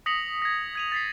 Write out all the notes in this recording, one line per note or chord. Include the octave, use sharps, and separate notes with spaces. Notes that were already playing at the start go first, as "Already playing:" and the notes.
D#6 A#6 B6 C#7 F7 F#7
G#6 A#6
G#6 D#7 F7
A6 B6 C7